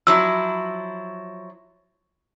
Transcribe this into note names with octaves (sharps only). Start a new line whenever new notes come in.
F3 F#3 E4 E6